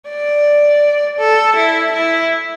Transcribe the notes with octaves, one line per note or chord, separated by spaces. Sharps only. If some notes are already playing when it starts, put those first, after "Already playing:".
D5
A4
E4
E4